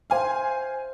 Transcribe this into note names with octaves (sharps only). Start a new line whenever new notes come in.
C5 E5 F5 G#5